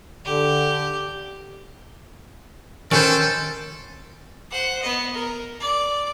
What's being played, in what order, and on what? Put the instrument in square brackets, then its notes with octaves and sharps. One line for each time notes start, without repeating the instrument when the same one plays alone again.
[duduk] D3 [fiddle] G4
[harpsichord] D#3 [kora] C#4 B4 C5 [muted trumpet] A4
[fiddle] C5 F#5
B3 D#5
A#4
D5